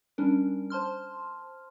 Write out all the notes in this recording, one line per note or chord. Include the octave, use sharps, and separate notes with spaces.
G3 C#4 D4 A#4
C5 A5 C6 F6